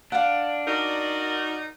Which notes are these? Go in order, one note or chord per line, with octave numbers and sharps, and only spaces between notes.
D4 F5 F#5
D#4 F#4 A#4 D5